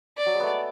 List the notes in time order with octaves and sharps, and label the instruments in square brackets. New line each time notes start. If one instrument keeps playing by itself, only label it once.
[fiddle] D5
[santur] F#3
G#3
A3 B3